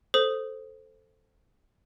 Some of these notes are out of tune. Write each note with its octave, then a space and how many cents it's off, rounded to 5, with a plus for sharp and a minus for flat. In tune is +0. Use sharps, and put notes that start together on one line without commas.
A4 +0 C5 +0 D#6 +0